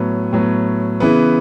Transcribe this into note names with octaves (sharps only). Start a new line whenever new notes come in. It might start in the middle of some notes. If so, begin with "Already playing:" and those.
Already playing: A2 F#3 B3
A2 F#3 B3
C#3 E3 B3